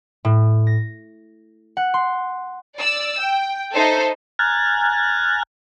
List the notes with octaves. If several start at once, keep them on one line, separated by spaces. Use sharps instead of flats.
A2
A#6
F#5
C6
D5 E6
G5
D#4 A4 C5 E5
G#5 A#5 F6 F#6 G#6 A6